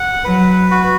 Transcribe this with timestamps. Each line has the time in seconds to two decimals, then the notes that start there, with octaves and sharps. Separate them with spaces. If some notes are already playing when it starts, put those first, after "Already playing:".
Already playing: F#5
0.24 F#3 B4
0.71 F#4